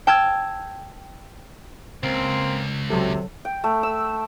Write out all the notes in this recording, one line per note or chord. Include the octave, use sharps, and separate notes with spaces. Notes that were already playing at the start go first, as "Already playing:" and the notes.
G5 A5 E6 F6 G#6
C#2 A#3 C4
C3 F#3 A4
G5
A3
E6